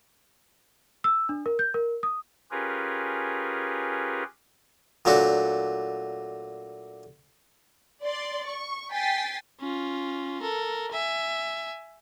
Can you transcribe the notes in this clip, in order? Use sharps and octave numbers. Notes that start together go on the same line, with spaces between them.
E6
D4
A#4
G6
A#4
D#6
C#4 F4 G4 G#4 A#4 B4
A#2 F#3 A3 D4 F#4
D5 C6
C#6
G5 G#5 A6 B6 C7
C#4 F4
A4 A#4
E5 G#5